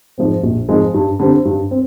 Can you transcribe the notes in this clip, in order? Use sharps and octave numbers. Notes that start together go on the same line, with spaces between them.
G#2 F3 G#3 C4
A#1
G#2 F3 G#3 C4
G2
D3 G3 C4
G2
C4